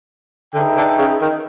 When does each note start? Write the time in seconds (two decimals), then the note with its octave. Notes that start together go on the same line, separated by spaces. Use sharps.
0.54 D3 D#4 G#4 B4 E5 G5
0.76 D3
0.98 C#3
1.21 D#3